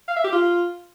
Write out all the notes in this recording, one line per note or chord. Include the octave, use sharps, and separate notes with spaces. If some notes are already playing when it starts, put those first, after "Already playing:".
F5
E5
G4
F4